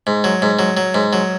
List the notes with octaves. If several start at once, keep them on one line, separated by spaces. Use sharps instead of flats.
G#2
F#3
G#2
F#3
F#3
G#2
F#3